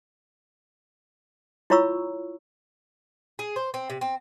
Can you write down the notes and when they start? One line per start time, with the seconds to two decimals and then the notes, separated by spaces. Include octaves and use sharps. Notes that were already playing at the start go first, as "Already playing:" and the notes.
1.70 E4 F4 C#5 A#5 C#6 E6
3.39 G#4
3.56 C5
3.74 C4
3.90 C3
4.01 C4